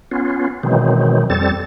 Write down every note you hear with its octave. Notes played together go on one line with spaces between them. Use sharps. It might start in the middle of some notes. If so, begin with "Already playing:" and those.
B3 C#4 F4
B2 D#3 E3 F#3 G#3 C4
F2 G3 C4 A4 A6